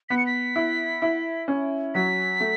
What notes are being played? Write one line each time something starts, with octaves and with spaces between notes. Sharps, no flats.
B3 B6
C#7
B6
E4
E4
C#4
F#3 B6
A3